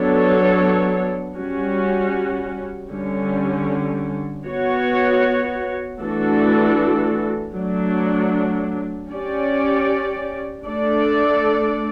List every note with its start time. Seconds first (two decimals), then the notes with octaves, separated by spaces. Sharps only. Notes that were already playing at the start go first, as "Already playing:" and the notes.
Already playing: F#3 B3 D4 A4 C#5
1.36 G3 C#4 F#4
2.90 D3 G3 C#4
4.45 B3 F#4 C#5
6.00 E3 A3 D4 F#4 A4
7.55 F#3 A3 D4
9.09 C#4 G4 D5
10.64 A3 D4 A4 D5